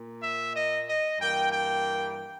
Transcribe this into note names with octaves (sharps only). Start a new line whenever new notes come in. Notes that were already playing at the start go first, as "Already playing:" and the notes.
Already playing: A#2 A#3
E5
D#5
D#5
G2 E3 A#3 G5
G5